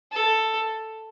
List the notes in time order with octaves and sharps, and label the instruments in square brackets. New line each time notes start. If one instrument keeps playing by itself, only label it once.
[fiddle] A4